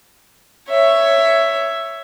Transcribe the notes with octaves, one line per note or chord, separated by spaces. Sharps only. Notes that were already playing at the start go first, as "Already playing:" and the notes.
C#5 E5